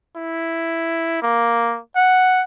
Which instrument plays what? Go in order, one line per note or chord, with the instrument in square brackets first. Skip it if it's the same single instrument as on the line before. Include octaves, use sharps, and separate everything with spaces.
[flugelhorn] E4
A#3
F#5